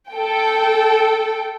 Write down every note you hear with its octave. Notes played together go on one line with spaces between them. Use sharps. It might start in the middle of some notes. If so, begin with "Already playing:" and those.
A4 G5